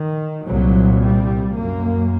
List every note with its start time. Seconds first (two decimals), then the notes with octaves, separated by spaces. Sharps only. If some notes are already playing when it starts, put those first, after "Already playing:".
Already playing: D#3
0.46 C2 A#2 F#3
1.02 G3
1.57 F#2 A#3